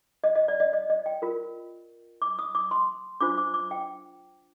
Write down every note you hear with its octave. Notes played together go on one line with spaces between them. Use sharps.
D#5
D#5
D5
D#5
D#5
D#5
G5
F4 A#4
D6
D#6
D6
C6
D4 F4 C5 D6
D6
D6
G5